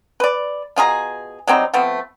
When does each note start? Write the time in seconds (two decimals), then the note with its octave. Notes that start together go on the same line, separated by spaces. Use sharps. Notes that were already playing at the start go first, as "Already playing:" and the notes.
0.20 B4 D5
0.76 B2 F4 G#4 A#5
1.47 F#3 G3 C4 D#4
1.74 F3 A3 B3 C4